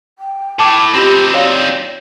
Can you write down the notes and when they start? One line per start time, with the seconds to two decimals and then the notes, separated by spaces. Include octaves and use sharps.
0.19 G5
0.59 A2 A5 D6
0.94 C4 D#4 F4 G4 B5
1.33 F#4 C#5 D5 F5